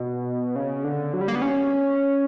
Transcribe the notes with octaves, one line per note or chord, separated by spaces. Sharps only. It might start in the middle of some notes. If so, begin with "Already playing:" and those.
Already playing: B2
C#3
D3
F#3
G3
A#3
B3
C#4